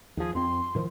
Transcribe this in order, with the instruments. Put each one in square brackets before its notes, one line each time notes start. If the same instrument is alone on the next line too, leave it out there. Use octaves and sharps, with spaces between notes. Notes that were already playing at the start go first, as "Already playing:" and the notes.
[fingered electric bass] D#2 F3 [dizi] G#4
[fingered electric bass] F2 C4 [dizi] C6
[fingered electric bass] A2 D#3 F3